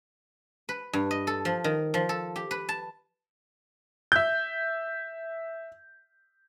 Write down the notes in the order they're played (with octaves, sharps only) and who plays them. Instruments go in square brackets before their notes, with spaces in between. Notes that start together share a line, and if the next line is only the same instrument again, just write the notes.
[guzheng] B4
G2
D#5
A4
F3
D#3
F3
A4
G4
B4
A5
[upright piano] E5 G6